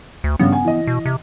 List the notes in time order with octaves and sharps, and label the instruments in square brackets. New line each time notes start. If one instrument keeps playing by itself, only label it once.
[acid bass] D2
[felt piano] G2 C#3 C#4 [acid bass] B3
[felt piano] G#5
E3 D#5
[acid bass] B2
C3